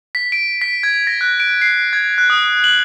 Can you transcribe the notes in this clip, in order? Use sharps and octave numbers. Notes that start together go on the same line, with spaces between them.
B6
D7
B6
G#6
A#6
F#6
D7
C7
G#6
F#6
D#6
F#7